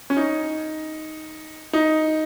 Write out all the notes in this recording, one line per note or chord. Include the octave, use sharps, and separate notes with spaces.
C#4
D#4
D#4